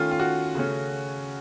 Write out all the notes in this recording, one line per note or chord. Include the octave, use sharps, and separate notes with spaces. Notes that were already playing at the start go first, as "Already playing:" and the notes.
Already playing: D#3 A3 C#4 F4
F4
F#4
C#3 A3 C#4